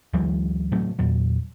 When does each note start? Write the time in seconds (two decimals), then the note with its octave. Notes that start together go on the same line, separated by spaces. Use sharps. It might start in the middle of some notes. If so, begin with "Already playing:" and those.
0.13 D2 E3 F#3 G#3
0.72 A2 C3 F#3 A3
0.99 E2 A#2 F#3